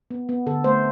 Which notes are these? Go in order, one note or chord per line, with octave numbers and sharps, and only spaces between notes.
B3
B3
D3 A4
A3 C5